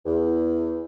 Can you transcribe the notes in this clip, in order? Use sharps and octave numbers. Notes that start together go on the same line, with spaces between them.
E2